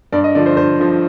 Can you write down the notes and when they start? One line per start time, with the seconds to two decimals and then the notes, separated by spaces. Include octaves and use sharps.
0.13 G2 D5
0.24 D#5
0.35 D3 F3 D5
0.46 C5
0.57 G2 C5
0.79 D3 F3